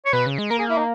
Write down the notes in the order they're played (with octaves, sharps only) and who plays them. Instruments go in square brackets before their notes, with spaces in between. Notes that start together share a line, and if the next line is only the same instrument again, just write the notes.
[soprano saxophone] C#5
[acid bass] B2 [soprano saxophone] B4
[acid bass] C#3
G#3
[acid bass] A#3 [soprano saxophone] A#4
[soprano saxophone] G#4
E4
D#4